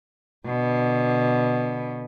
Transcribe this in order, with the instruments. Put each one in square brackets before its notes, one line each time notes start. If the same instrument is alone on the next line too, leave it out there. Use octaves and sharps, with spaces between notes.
[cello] B2 D3